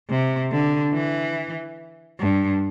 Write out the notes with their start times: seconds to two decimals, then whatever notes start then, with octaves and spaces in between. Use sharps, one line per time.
0.10 C3
0.51 D3
0.94 E3
2.20 G2